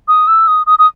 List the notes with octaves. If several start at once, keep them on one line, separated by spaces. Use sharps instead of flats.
D#6
E6
D#6
D#6
D#6